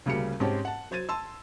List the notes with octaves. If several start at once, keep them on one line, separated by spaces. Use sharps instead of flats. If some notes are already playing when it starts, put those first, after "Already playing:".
D2 C#3 G3 A#3 C#7
G#2 C4 C#4 G4 A5
F#5 A5
F#3 C5 G#6 A6 D#7
A5 C6 E6